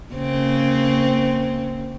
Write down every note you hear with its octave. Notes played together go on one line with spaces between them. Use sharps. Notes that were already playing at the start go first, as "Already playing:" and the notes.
C#3 A#3 C4